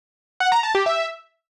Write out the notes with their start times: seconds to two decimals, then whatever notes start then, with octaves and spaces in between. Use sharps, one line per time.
0.40 F#5
0.52 A#5
0.63 A5
0.75 G4
0.86 E5